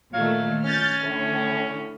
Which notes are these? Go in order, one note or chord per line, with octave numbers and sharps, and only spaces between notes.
A#2 D#3 F#3 A3 C#5 F5
C#4 F6 G6 A6
A2 D3